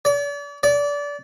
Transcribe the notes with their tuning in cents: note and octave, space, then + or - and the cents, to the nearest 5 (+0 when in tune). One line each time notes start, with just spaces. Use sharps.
D5 -40
D5 -25